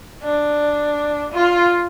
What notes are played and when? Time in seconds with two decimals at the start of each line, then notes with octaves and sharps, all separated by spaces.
0.23 D4
1.32 F4